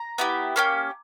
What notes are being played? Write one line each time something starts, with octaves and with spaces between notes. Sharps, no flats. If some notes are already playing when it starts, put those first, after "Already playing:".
Already playing: A#5
B3 E4 G4
A#3 C#4 G4